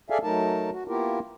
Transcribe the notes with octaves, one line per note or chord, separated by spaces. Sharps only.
G#4 A4 D5 E5 F5 G#5
F#3 A3 D#4 A#4 A5
F#4
A#3 B3 E4 F4 G4 A#4